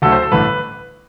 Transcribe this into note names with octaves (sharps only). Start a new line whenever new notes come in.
D2 D3 F#3 A3 A4
C5
A4
A1 G2 D3 A3 B4